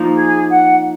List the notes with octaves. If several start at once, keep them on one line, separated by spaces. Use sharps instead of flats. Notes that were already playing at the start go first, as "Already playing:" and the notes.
Already playing: F3 A#3 D#4
G#4
F#5